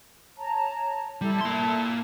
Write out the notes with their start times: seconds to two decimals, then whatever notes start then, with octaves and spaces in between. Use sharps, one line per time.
0.38 C#5 A5 A#5
1.21 G3 E4 A4 A5
1.41 A#3 C6